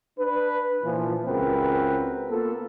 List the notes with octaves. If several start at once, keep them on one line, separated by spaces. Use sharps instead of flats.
D4 B4
A#2 E3 F3
C#2 C4 F#4 A#4 B4
A#3 B3 F4 A4